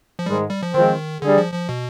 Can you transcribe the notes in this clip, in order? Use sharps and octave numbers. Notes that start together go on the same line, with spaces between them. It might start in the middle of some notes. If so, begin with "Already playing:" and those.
F3
G#2 D#3 G3 G#3
G3
F3
D#3 F3 G#3 C4
D3 G3 D4 G#4
F3
F3
B2